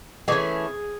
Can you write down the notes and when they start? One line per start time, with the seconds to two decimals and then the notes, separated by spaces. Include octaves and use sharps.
0.28 E3 G#3 A3 C#4 G#4